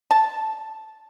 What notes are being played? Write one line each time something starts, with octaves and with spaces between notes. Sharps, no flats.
A5